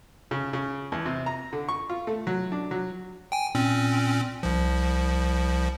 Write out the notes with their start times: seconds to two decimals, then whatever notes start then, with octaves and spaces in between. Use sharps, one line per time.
0.31 C#3
0.53 C#3
0.92 E2
1.06 C3
1.26 A#5
1.53 D3
1.69 C#6
1.89 F4
2.07 A3
2.27 F#3
2.52 D4
2.71 F#3
3.32 G5 G#5
3.55 A#2 C4 C#4
4.43 C2 F3